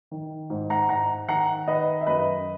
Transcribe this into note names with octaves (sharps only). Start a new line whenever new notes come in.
D#3
G#2
F#5 A#5
G#2 F#5 A#5
D#3 F#5 A#5
D#3 B4 D#5
E5
F#2 B4 D#5